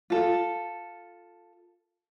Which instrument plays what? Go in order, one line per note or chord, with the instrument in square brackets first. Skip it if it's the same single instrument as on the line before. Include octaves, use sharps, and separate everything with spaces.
[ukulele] F4 A4